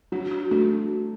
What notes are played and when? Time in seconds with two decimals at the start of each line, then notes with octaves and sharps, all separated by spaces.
0.12 F#3 D4 F#4
0.31 D4 F#4
0.51 A3 D4 F#4